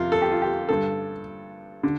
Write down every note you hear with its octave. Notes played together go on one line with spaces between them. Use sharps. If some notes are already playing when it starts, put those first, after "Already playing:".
Already playing: F2 C3 F4
A4
G4
F4
G4
G2 D3 A4
D3